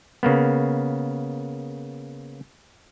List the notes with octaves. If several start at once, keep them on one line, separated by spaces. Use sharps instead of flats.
C#3 A#3 B3